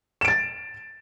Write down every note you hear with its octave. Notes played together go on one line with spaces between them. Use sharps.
A6 D7 E7